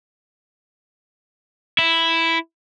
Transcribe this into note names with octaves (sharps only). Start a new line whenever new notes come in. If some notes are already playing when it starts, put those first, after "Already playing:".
E4